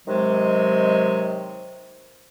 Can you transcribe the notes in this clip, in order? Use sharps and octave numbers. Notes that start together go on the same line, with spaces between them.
C3 D#3 F#3 G#3